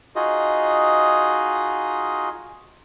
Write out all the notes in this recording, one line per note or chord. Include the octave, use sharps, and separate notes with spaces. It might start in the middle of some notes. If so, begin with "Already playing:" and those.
D#4 F4 F#4 G#4 D#5